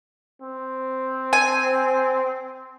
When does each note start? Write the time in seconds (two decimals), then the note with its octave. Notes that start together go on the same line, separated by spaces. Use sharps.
0.42 C4
1.33 G#5